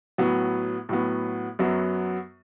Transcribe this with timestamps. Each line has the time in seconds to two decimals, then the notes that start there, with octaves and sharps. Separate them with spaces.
0.18 A2 F#3 B3
0.89 A2 F#3 B3
1.59 F#2 F#3 B3